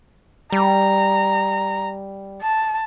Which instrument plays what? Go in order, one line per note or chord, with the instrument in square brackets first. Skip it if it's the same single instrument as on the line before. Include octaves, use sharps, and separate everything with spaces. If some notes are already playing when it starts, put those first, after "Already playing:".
[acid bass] G3 [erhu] A#5
[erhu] A5